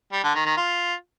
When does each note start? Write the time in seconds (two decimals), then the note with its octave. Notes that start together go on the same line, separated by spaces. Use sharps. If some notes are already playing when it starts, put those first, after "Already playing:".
0.13 G3
0.24 D3
0.35 D#3
0.46 D#3
0.57 F4